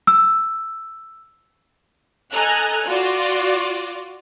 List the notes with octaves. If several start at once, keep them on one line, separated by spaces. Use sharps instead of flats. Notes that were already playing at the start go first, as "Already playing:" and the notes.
E6
A4 D#5 G#5 A#5 F6 F#6
F4 F#4 D5